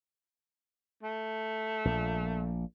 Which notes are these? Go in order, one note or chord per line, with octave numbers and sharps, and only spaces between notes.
A3
A#1 A#2